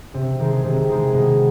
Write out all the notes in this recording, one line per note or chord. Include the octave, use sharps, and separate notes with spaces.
C3
D#3 G#3
C3
D#3 G#3
B2